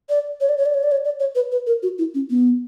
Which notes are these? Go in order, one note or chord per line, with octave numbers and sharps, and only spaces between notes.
D5
C#5
D5
C#5
D5
C#5
D5
C#5
D5
C#5
B4
B4
A#4
F#4
E4
C#4
B3